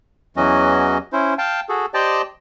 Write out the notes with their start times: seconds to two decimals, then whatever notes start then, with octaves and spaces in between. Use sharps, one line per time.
0.37 E2 E3 F#3 C#4 F#4 D#5
1.13 C#4 E4 C5
1.38 F5 G5 A5
1.69 F#4 G#4 A4
1.94 G4 C5 D5 D#5 G5 A5